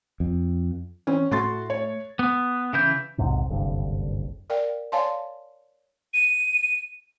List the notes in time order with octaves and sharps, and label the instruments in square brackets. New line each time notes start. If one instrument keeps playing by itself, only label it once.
[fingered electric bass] F2
[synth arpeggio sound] E3 C4 [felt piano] C#4
[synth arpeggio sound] A2 A3 [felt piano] F#4 C6 A6
[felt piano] C#5
[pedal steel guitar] B3
C#3 E3 E4 B4 G6
[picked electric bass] B1 E2 G#2 C3
F#1 C2 G2 D3
[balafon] A#4 D5 F5 G5
C#5 D5 F5 G#5 A5 C6
[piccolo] D#7